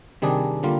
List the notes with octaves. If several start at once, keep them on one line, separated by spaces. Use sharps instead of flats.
C3 D#3 G3 D4 G#4
D3 G3 A#3 F4